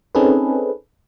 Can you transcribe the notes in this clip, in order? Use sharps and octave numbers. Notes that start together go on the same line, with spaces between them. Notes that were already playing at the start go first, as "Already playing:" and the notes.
C4 C#4 D#4 G#4 A4 B4